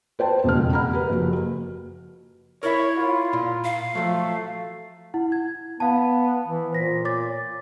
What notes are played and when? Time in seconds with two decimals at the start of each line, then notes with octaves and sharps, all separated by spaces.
0.19 B4 C5 G5 A5
0.44 E1 F2 A#2 C#3 G#3 F6
0.72 F#5 A#5 B5 F6
0.93 G4 A#4 B4
1.09 F#1 F3 F#4
2.63 E4 A#4 C#5 D5 E5
2.98 F4
3.33 A#2
3.64 F5
3.95 F3 F#3 A3
5.14 E4 F#5
5.32 G#6
5.80 B3 F5 A5
6.48 E3
6.73 A#2 C5 A#6 B6
7.05 C#5 D6 A6